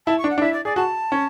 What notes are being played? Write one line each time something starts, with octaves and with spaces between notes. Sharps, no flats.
E4 A5
C#6
D4
F#5
D4
E4 E5
D5
G#4 D5
F#4 A5
C#4